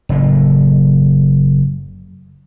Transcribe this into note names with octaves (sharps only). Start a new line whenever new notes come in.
F#1 A2